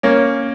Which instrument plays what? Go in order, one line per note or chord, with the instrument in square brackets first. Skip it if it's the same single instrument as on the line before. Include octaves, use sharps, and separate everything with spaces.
[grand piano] A#3 C#4